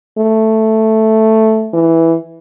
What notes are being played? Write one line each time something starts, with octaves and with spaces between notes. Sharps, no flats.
A3
E3